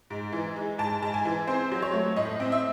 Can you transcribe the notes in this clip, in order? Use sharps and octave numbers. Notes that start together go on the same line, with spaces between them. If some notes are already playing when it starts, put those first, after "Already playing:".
G#2
E3
G#3
G#2 A5
G#2 A5
G#5
E3
C4 C5
F#3
C#5
A3
A2 D#5
C4
E5